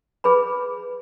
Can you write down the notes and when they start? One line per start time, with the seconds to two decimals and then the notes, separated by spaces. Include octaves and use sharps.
0.24 G#4 B4 B5